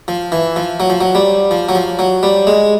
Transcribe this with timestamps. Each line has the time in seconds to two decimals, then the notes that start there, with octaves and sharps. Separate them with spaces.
0.08 F3
0.32 E3
0.56 F3
0.80 F#3
0.90 F3
1.01 F#3
1.15 G3
1.51 F3
1.69 F#3
1.75 F3
1.99 F#3
2.23 G3
2.47 G#3